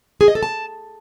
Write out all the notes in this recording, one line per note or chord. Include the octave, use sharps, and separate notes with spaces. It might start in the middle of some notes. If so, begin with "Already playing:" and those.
G#4
D#5
A4
A5